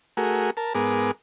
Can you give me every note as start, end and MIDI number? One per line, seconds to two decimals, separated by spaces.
0.17 0.50 57
0.17 0.50 66
0.17 0.50 68
0.17 0.50 70
0.57 0.73 70
0.57 0.73 81
0.75 1.11 44
0.75 1.11 59
0.75 1.11 68
0.75 1.11 70
0.75 1.11 86